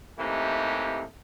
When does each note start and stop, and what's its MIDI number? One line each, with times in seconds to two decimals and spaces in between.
0.18 1.03 48
0.18 1.03 52
0.18 1.03 57
0.18 1.03 58
0.18 1.03 63
0.18 1.03 67